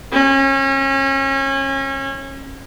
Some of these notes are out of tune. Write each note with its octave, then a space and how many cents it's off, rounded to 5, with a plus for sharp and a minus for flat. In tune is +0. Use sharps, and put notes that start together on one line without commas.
C#4 -30